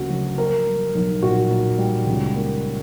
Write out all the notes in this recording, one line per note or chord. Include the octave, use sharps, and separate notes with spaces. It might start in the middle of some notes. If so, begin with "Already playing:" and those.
Already playing: D2 C#3 A#3 F#4
F#3
A#3 A#4
G3
B1
A#2 F#4
A#3
G3
C#2
A#3